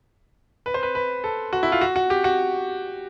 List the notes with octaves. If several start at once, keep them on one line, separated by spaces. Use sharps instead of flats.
B4
C5
B4
B4
A4
F#4
E4
F4
F#4
F#4
G4
F#4